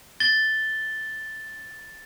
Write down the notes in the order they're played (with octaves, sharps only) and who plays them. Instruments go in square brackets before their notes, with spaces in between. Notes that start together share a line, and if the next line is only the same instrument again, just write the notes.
[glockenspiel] A6 G7